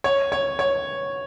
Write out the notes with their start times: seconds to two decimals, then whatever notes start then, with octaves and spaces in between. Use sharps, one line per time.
0.04 C#5
0.32 C#5
0.59 C#5